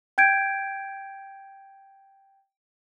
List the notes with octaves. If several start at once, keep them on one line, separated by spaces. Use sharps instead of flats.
G5 G6 G#6 D7